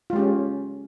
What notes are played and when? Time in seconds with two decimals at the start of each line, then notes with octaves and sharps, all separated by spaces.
0.10 F4
0.13 G#3
0.16 G4
0.19 C#4